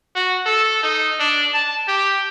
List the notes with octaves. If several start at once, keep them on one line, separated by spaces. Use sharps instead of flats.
F#4
A4
D#4
D4
A5
G4